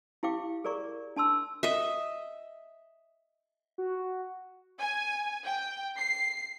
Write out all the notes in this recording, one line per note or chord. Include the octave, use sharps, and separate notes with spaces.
E4 G4 F5 G5 D6
G#4 A#4 D5 A#5 C#6
D4 A5 C6 E6
D#5 E5
F#4
G#5
G5
C7